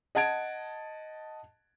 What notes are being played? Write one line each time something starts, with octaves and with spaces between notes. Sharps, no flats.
D#5 F#5 A5 G#6 D7